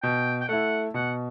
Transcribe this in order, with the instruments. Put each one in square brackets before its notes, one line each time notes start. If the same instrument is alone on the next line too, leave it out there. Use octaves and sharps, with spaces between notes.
[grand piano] B2 [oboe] G5
[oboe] G5
[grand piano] A3 E4 [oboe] F#5
[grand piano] B2 [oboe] F#5